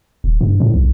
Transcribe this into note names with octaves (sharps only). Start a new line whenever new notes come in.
D1
G2
A2
B1